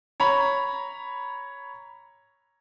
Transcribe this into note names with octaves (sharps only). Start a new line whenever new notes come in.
C#5 A#5 B5